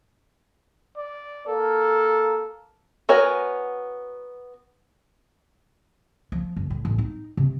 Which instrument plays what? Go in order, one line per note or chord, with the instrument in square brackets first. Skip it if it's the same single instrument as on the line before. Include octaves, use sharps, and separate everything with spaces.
[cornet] D5
[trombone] A#3 [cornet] A4
[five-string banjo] B3 F#4 A#4 C#5 G#5
[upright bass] F3
F#1
A2
A1
D#4
C3